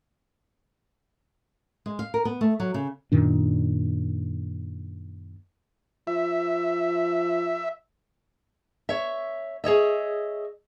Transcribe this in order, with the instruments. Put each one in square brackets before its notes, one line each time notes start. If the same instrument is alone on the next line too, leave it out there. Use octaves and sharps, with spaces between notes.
[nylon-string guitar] G#3
F5
A#4
B3
A3
F#3
C#3
[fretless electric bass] F#2 A#2 D#3 D4
[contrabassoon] F3 [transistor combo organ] E5
[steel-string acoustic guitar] C#5 E5
G#4 C#5 D#5 E5